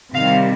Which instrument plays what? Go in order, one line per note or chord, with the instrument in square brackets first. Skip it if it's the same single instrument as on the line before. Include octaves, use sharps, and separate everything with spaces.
[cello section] C3 D#3 G3 F5